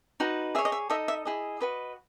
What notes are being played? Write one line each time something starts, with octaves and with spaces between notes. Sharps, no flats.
D#4 F#4 B4
G#4 C#5 E5
D#5
E5
D#4 A4 D#5 E5
E5
E4 G#4 D#5
F#4 B4 D#5